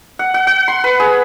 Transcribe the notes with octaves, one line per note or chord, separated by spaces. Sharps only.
F#5
F#5
F#5
C6
B4
G#4